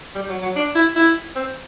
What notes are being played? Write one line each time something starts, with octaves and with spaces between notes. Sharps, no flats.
G3
F#3
F#3
D4
E4
E4
C4